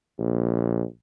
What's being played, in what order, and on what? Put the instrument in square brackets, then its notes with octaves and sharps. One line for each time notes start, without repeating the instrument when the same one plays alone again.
[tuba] A#1